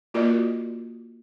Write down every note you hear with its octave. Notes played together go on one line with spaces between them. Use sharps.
A#3 F4 F#4 A#4 D5 D#5